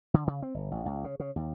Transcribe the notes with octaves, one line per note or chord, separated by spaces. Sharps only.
D3
C#3
C4
G1
A1
C#2
C#3
C#3
D#2